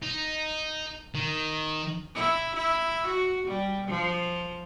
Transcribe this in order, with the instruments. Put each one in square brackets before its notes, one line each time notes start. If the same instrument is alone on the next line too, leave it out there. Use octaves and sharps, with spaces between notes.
[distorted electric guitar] D#4
D#3
[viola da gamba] E4
E4
F#4
G3
F3